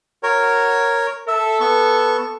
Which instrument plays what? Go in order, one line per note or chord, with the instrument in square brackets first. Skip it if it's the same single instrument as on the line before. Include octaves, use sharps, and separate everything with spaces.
[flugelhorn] F#4 [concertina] A#4 C#5
[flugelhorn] A4 [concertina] E5
[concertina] B3 C#6